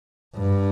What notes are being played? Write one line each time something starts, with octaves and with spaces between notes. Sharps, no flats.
G2